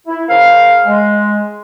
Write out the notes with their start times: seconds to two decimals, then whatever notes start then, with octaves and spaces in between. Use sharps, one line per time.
0.07 E4
0.28 C#3 A#3 C5 F5
0.86 G#3